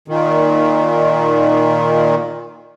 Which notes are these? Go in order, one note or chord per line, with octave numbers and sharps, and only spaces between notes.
A#2 D#3